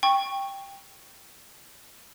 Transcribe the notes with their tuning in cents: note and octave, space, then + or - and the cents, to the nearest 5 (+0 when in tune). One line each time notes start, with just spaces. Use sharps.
G5 +10 C#6 -10